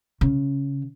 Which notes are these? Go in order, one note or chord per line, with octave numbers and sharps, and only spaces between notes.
C#3